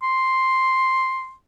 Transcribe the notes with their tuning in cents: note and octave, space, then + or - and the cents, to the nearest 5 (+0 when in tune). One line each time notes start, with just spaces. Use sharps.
C6 +5